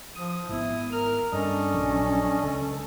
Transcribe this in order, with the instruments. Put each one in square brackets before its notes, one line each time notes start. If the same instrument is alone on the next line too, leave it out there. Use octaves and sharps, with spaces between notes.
[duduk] F3 [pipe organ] D#6
[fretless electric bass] G#1 B3 [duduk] E4
[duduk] A#4 [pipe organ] F6
[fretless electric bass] G2 [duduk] C#4 [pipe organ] D4 A4 D#5
[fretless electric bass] A#1 F#3
[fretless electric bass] C#2 [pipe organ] A4